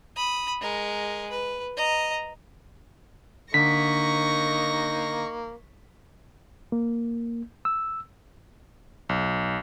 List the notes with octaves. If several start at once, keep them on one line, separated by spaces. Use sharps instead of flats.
B5 D#6
G#3 A#4
B4
D#5 A#5
D3 A#3 D#4 C#6 A#6 B6
A#3
E6
B1